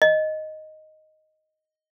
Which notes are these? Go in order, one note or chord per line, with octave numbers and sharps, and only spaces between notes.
D#5